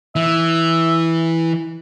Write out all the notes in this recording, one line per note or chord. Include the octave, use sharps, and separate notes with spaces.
E3 E5